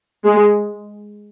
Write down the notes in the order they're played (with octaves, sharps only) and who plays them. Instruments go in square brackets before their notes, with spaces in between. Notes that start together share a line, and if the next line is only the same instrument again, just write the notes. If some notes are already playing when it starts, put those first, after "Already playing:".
[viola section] G#3